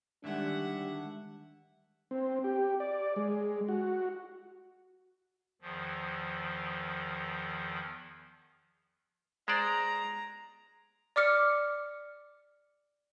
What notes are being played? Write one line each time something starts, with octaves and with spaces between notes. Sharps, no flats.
D3 D#3 G3 G#3 D4 E5 F#5
C4
G4
D5
G#3
F#4
E2 D#3 F3
G#3 C5 D5 A#5
D5 D6 F6 C#7